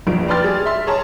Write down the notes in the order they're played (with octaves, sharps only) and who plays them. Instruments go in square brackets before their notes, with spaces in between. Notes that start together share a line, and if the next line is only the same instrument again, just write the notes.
[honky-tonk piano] F1 A#1 F4 D7
B4 D5 G5 C6 F6 A6
G3 G#4
E5 C6
G#4 C#5 A5 A#5